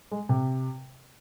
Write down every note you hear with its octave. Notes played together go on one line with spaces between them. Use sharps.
G#3
C3